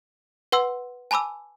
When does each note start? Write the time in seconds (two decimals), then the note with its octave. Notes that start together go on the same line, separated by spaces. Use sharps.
0.52 B4 F#5 C6 E6
1.11 G#5 A5 B5 D6 E6